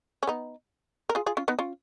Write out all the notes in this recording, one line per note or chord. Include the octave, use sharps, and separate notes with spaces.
C#4
B3 D#4
A#4
F4 G#4
F4 G#4
C#4 F4
B3 D#4
C#4 F4